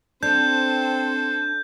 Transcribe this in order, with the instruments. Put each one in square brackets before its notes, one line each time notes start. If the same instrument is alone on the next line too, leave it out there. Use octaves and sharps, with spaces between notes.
[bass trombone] C4 [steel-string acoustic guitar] D4 [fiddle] A4 C5 [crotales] G6